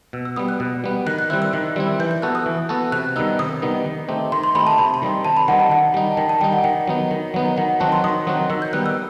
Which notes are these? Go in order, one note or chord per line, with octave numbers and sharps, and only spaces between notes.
B2 E6
E6
G3 B3 D#6
F#6
B2
G3 B3
D#3 F#6
F#6
G3 C4 E4 F#6
E6
D#3 F#6
G3 C4 E4
E3 G6
G6
B3 F#4 A4 F#6
D#6
E3
B3 F#4 A4
C3 F#6
D#3 G3 B3 D#4 E6
C3 D#6
D#3 G3 B3 D#4
D#3
A3 C4 D#4 G4
D#3 C6
C6
A3 C4 D#4 G4 B5
A5
C3 B5
C6
D#3 G3 C4 D#4
C3 A5
B5
D#3 G3 C4 D#4 F#5
A5
D#3 F#5
G3 D#4
A5
D#3 G5
A5
G3 D#4 G5
F#5
D#3 G5
F#3 B3 D#4
D#3
F#3 B3 D#4
D#3 F#5
F#5
F#3 C4 D#4 F#4 A5
C6
D#3 D#6
F#3 C4 D#4 F#4
D#3 E6
G6
G3 B3 D#4 F#6
E6